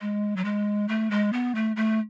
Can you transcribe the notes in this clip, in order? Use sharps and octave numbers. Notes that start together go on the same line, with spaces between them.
G#3
F#3
G#3
A3
G#3
B3
A3
A3